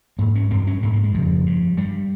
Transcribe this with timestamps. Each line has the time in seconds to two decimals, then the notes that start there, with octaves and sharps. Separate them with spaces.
0.19 G#2 A#3
0.35 C#4
0.51 G2 C4
0.67 C#4
0.83 G#2 A#3
0.93 A#3
1.04 G#3
1.14 F2 C#3 F3
1.46 G2
1.77 G2 G3